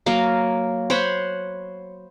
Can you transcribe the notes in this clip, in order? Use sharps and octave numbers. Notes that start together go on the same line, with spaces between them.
F#3 A#3 F5
C5 C#5 F#5 B5